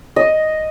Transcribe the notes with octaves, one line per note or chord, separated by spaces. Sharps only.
D#5